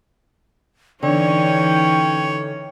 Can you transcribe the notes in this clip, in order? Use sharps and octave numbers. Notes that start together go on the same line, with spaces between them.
D3 E3 C#4 D#4 C#5 G5